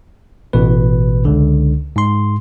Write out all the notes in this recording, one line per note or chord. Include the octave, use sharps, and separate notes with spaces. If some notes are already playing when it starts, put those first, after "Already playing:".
A1 B2 B4
C#2 D3
G#2 C6